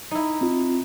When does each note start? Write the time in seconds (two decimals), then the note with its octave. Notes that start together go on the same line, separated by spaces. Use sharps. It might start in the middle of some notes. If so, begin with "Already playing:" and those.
0.11 D#4 E4
0.41 C4 F4